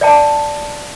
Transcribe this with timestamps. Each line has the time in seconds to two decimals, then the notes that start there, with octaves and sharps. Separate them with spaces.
0.01 D5 E5 G5 A5